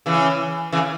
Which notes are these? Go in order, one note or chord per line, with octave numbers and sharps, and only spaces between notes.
C#3 E3
C#3 E3